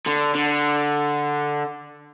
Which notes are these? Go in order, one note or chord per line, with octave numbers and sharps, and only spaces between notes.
D3
D3